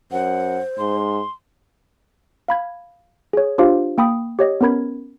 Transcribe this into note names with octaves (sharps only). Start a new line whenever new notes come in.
F#2 C5 F#5
G#2 C6
F5 B5 G#6
G#4 C#5
D4 F4 G4 C5 F5
A#3 G5 B5 D#6
G4 C#5 D#5
B3 C#4 A#4 B5 G#6